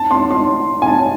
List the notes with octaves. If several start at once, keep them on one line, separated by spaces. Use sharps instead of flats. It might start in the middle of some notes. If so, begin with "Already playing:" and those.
Already playing: A5
C6
C6
G#5
A5